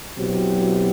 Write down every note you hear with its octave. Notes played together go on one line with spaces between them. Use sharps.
B2 F#3 C4 E4 G4